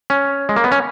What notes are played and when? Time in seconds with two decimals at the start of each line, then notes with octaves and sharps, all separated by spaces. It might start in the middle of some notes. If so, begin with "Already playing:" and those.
0.10 C#4
0.49 G#3
0.56 A#3
0.64 B3
0.72 C#4